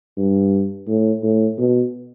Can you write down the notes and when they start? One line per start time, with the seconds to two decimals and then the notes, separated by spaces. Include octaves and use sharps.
0.17 G2
0.87 A2
1.23 A2
1.58 B2